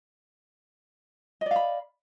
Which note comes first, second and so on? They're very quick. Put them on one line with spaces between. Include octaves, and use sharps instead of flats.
D#5 D5 F5 B5